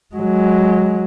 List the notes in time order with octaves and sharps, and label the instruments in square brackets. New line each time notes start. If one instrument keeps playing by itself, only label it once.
[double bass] F#3 G#3